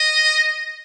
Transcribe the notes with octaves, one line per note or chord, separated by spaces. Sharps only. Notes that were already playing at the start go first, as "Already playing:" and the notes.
Already playing: D#5